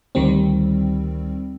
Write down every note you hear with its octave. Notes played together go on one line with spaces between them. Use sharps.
D2 D#3 G3 C4